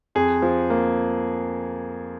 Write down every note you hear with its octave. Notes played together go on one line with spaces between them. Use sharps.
F2 G#4
F3
A#3